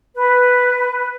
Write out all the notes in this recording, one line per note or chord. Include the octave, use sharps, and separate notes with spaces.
B4